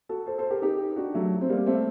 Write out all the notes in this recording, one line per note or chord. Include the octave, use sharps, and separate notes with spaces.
F#4 A4
A4 C5
A4 C5
G4 A#4
D#4 G4
D4 F#4
F#3 A3
C4
G3 A#3
A3 C4